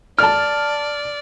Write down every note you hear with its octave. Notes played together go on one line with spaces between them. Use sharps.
D5 A5 F6